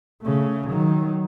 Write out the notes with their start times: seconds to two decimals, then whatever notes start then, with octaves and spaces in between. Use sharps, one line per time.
0.22 C#3 A3
0.69 D#3 F#3